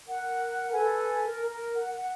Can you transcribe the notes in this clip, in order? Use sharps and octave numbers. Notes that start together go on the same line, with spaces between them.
A#4 F#5
A4 B4 G#5
A#4
A#4
F#5
F#5